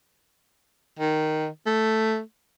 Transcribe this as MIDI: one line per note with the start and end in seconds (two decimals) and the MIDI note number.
0.99 1.47 51
1.66 2.20 57